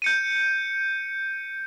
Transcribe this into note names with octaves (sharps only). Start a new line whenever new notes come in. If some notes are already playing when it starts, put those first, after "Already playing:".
G6 C#7 D#7